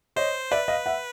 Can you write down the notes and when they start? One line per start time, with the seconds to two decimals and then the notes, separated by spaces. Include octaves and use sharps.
0.16 C5 C#5 D#5
0.51 B4 D5 E5
0.68 D#5 F5
0.86 E5 F#5